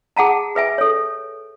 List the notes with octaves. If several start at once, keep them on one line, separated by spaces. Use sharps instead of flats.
G#4 F#5 A5 A#5
G#4 B4 E5 G#5
A4 C#5